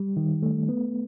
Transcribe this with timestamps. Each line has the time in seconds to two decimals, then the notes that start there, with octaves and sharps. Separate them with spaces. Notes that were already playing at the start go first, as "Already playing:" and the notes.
Already playing: G3
0.17 D#3
0.43 A3
0.69 B3